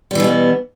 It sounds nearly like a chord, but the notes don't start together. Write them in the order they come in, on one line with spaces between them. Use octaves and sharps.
G3 E3 B2 B3